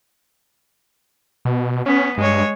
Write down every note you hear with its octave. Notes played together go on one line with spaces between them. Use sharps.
B2
B3 C#4
G2 G#3 C#5